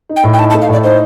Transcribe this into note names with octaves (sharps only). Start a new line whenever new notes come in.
D#4
G5
A2
G5
D#4 A5
A5
A3
F5
A2 D5
D#4 C5